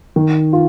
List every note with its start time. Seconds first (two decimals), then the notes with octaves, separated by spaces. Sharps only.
0.16 D#3
0.53 F4